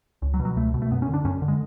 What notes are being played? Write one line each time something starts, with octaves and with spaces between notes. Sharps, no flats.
C#2
F#3
B2
F#3
C#2 A3
B2
A3
F#2 B3
C#4
D3
D4
F#2 C#4
D3
G#3